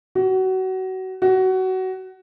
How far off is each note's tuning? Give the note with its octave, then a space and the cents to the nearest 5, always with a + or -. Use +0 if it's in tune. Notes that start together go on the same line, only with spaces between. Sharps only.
F#4 +25
F#4 +20